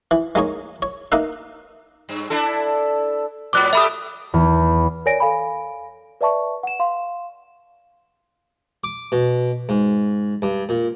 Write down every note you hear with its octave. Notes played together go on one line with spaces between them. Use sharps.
E3
G#3 A#3 D#4 C#5
C#5
A#3 D#4 B4 E5
G2
D4 E4 A4
A2 F#3 B3 D6 F#6
A3 G4 E5 B5 D#6
E2
A#4 C#5 D5 G#5 A#6 D7
A4 F5 G#5 B5
B4 D5 E5 A5 C#6
F#5 E7
F5 C6
D6
B2
G#2
G2
A#2